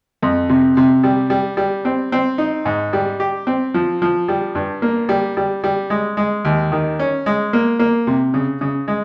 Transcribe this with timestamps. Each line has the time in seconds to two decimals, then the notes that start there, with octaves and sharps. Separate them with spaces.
0.22 F2
0.49 C3
0.77 C3
1.04 G3
1.30 G3
1.57 G3
1.85 C4
2.12 C4
2.38 D#4
2.65 G#2
2.93 G3
3.20 G4
3.47 C4
3.74 F3
4.02 F3
4.28 G3
4.55 G2
4.82 A#3
5.09 G3
5.37 G3
5.64 G3
5.90 G#3
6.17 G#3
6.45 D#2
6.72 D#3
6.99 C#4
7.26 G#3
7.53 A#3
7.79 A#3
8.07 C3
8.34 C#3
8.61 C#3
8.88 G#3